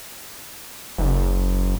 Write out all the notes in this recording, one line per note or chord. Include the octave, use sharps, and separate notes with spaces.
F#1